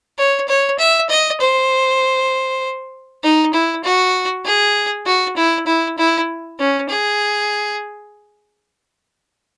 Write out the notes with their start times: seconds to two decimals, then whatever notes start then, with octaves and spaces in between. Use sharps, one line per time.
0.18 C#5
0.48 C#5
0.79 E5
1.09 D#5
1.40 C5
3.23 D#4
3.53 E4
3.84 F#4
4.45 G#4
5.06 F#4
5.36 E4
5.66 E4
5.98 E4
6.58 C#4
6.89 G#4